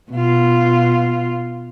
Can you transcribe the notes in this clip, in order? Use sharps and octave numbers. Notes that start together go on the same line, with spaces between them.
B2 F4